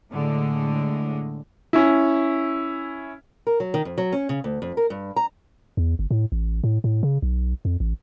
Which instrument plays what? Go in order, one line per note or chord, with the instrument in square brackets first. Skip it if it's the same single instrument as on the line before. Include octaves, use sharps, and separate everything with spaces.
[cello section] A2 D3 G#3
[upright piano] C#4 E4
[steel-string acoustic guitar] A#4
F#3
D#3
F2
F#3
C#4
C#3
D2
F2
A#4
G2
A#5
[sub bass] E2
G1
A2
A1
A2
A2
C#3
B1
F2
A1